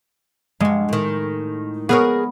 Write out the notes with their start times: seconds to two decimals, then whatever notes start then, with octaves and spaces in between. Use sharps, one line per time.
0.60 G2 G#3 F#4
0.89 A2 D#3
1.89 B3 G#4 A#4 C#5